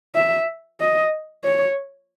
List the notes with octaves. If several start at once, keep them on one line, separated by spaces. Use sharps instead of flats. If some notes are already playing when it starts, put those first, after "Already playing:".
E5
D#5
C#5